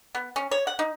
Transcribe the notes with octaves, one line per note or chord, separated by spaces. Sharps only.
B3
C#4
C#5
F#5
D#4